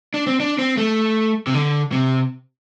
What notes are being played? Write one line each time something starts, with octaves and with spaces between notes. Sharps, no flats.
D4
C4
D4
C4
A3
C3
D3
C3